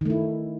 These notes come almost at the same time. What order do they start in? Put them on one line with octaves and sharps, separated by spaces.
D#3 A3 E4